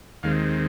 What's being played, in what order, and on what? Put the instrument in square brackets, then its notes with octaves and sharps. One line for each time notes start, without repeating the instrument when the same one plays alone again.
[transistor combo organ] D#2 D#3 G#3 C4 F5